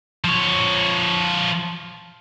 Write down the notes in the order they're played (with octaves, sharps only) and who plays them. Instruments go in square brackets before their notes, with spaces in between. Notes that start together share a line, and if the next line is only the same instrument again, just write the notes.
[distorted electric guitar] F3 C#5